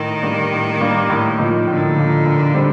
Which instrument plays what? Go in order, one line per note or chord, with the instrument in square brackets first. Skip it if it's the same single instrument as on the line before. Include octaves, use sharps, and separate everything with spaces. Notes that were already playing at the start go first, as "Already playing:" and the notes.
Already playing: [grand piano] A2 [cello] D#3
[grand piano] G3 A#3 D4
A2
G3 A#3 D4
A2
F3 A#3 D#4
[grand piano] A2 [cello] D3
[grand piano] F3 A#3 D#4
A#2
G3 C4